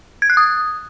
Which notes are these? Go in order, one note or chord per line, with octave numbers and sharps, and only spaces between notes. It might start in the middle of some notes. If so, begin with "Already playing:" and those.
G#6
F#6
D#6